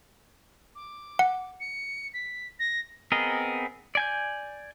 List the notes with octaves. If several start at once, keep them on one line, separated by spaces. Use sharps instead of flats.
D6
F#5
C#7
B6
A#6
B3 C4 G#4 A#4 D#5
D5 G#5 G6